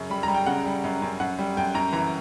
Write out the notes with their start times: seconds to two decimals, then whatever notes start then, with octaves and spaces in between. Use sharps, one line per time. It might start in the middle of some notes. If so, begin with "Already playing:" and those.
Already playing: F#2 C#3
0.10 G3 B5
0.23 A#5
0.28 G3
0.35 G5
0.46 C#3 F#5
0.66 G3
0.84 F#2
1.02 F#2
1.20 F#2 F#5
1.39 G3
1.57 F#2 G5
1.74 F#2 A#5
1.92 E3 A#5